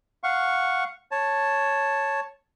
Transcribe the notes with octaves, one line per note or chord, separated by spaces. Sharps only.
F5 F#5 C#6
C#5 A5